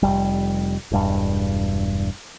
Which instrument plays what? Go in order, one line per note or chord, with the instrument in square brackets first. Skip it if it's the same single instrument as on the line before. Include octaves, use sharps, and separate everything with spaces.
[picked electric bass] F1 C2 G3
E1 G2